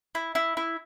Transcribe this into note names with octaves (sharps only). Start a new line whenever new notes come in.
E4
E4
E4